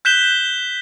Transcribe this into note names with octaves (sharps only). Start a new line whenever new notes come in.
F#6 G6 B6 E7 G7